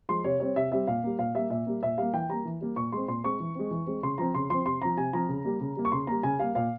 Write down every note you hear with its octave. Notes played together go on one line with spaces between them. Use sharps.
F3 G#3 C6
C3 C#5
G3 C4 C#5
C3 E5
G3 C4 E5
A#2 F5
G3 A#3
A#2 F5
G3 A#3 E5
A#2 E5
G3 A#3
A#2 E5
G3 A#3 F5
E3 G5
G3 A#3 A#5
E3
G3 A#3
A#2 C#6
G#3 C4 C6
A#2 C6
G#3 C4 C#6
E3
G#3 C4
E3
G#3 C4
C#3 C6
F3 C4 A#5
C#3 C6
F3 C4 C6
C3 C6
F3 C4 A#5
C3 G#5
F3 C4 A#5
C#3
G3 A#3
C#3
G3 A#3
C#6
C#3 C6
G3 A#3 A#5
C#3 G#5
G3 A#3 F5
A#2 F5